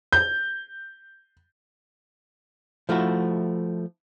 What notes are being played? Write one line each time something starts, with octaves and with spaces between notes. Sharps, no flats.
G6
F3 A3 E4 F#4